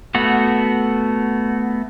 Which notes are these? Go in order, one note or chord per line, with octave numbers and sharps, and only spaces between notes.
A3 B3 F#4